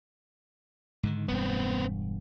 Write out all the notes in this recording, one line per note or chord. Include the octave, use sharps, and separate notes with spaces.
G#2 D3 D#3
E1 G2 B3 C4